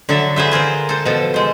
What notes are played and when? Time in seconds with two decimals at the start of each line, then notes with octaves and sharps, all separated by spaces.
0.09 D3 F#3 A4 E5
0.36 G#4 B4 C5 E5
0.51 F4 G#4 A#4 C5
0.89 A4 C5
1.05 B2 F3 A4
1.34 G#3 C5